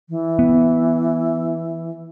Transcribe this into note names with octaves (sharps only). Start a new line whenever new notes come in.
E3
B3